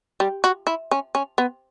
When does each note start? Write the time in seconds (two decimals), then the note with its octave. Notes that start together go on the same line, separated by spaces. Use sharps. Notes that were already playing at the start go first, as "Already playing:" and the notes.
0.20 G3
0.44 F#4
0.67 E4
0.91 C#4
1.15 C#4
1.38 B3